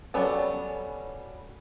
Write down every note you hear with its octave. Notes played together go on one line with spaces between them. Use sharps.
F#3 G3 B3 C#4 A4